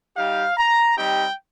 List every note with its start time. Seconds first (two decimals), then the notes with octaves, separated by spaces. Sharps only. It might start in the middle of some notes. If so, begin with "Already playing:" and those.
0.17 G3 D#4 G4 F5
0.58 A#5
0.98 G3 C4 D#4 G4 G5